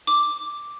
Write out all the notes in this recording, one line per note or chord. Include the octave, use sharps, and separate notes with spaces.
D6